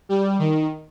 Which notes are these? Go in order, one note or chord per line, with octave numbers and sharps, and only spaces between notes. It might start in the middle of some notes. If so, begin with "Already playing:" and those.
G3
D#3